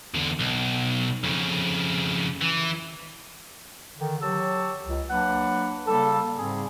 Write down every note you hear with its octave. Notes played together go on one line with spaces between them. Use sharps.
E2 D3
B1
F2 C#3
E3
D3 D#3
F#3 G4 C#5 A5 E6
C#2
F#3 A#3 D4 B4 F#5
C#3 G3 A#3 A4
G#2 C#3 G3 C4 G#4